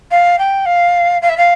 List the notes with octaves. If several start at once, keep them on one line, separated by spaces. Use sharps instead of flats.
F5
G5
F5
F5
E5
F5